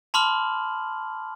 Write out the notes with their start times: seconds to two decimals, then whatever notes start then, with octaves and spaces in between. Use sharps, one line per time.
0.14 A5 B5 C6 D6 F6 F#7